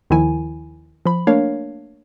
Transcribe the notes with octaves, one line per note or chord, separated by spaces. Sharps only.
D#2 D#3 F3 E4 G#5
F3 B5
A3 A#3 D4 A#4 C#5 F5